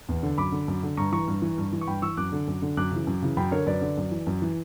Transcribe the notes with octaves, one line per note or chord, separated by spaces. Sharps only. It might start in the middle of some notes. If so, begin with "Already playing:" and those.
E2
D3
F#2 B5 D6
D3
F#2
D3
G2 A#5 C#6
E3 A#5 C#6
G2
E3
G2
E3
C#6
G2 G5 B5
E3 C#6 E6
F#2 D6 F#6
D3
F#2
D3
F#2 D6 F#6
C#3 E3
F#2
C#3 E3
F#2 G5 B5
D3 A#4 C#5
F#2 B4 D5
D3
F#2
E3
F#2
E3